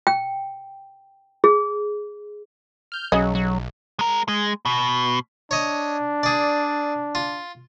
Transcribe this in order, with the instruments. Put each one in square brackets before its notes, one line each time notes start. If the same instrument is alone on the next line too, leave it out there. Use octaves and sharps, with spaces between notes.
[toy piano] G5
G#4
[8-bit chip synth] F6 G6
[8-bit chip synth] B1 [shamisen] C#3 D#5 [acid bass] F#3
[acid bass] F#3
[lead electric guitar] G#3 A#4
G#3
B2
[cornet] D4 [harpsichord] C#5 D#5
[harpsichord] G#4 D5
F4